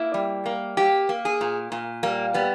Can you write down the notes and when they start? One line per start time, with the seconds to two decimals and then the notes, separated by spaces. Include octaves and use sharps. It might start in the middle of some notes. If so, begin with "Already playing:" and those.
Already playing: A#3 E4
0.14 G3
0.46 A#3
0.77 A#3 G4
1.09 A#3
1.25 G#4
1.41 A#2
1.72 A#2
2.03 G3 A#3
2.34 G3 B3